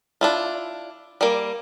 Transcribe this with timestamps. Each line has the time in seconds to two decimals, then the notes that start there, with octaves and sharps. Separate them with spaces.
0.21 D4 E4 F4
1.21 G3 A#3